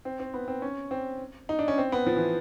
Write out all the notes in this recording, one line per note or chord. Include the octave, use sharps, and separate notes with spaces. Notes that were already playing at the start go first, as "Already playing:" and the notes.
C4
C4
B3
C4
C#4
C4
D#4
D4
C#4
C4
B3
F3
E3